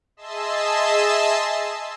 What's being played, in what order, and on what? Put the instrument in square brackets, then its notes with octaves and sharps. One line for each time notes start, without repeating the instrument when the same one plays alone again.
[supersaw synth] G#4 D#5 E5 A5 C6 E6